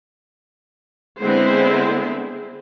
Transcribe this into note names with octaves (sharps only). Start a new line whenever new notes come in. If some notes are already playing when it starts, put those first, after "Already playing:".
D3 G#3 B3 C4 E4 C5